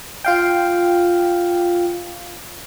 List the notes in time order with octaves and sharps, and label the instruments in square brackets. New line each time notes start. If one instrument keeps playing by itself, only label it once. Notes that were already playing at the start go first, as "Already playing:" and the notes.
[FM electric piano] F4 F5 G5